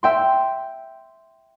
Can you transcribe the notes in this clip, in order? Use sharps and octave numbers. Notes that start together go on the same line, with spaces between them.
E5 G5 C6